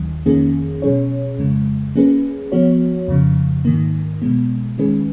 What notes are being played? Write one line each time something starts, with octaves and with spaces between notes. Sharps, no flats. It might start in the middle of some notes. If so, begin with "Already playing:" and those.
Already playing: D#2 D#3 F#3
F2 D#3 A#3 C#4 G#4
B2 F#3 C#4 G#4 C#5
F2 C#3 G#3
F#3 A#3 C#4 G#4 B4
F3 B3 F#4 C#5
F2 C#3 F3
G#2 D#3 A#3
B2 G#3 B3
D#3 G#3 C#4 G#4 B4